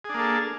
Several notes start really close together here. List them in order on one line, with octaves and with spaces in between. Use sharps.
G#4 D4 A#3 A4